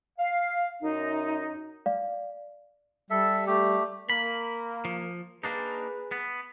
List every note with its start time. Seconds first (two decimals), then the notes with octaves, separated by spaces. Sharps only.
0.18 F5
0.82 F#2 D#4
1.86 D5 F5
3.10 G3 A4 E5
3.47 A3 G4
4.10 A#3 B5
4.85 F3
5.44 A#3 D4 D#4 G#4 B4
6.12 B3